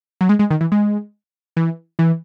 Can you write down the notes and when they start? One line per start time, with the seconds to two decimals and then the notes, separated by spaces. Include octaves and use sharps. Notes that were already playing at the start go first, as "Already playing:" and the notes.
0.21 F#3
0.29 G#3
0.39 G#3
0.51 D#3
0.61 E3
0.72 G#3
1.57 E3
1.99 E3